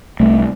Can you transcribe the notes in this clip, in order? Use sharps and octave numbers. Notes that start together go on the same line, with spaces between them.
C2 A3